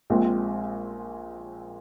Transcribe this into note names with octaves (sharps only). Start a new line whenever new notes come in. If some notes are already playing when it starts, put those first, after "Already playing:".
A#1 A#2 G#3 C4